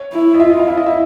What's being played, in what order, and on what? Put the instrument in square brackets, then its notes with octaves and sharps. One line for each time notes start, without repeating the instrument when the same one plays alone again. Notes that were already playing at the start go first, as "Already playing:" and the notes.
Already playing: [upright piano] C#5
[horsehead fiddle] E4
[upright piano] D#5
[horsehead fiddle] F4 [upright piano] E5
[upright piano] D#5
F5
[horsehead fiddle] E4 [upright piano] E5
[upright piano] D#5
E5